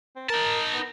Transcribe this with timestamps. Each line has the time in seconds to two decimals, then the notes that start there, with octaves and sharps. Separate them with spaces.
0.16 C4
0.29 D#4 A#4 A5
0.73 B3